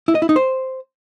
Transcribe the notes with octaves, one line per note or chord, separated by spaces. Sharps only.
E4
D#5
E4
D#4
C5